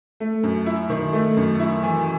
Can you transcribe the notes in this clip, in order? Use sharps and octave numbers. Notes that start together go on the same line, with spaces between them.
A3
F#2
E4
D#3
A3
F#2
E4
E3